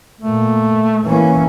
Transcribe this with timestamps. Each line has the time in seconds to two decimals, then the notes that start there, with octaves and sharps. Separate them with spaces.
0.21 A#2 A3
1.04 E3 A#3 C#4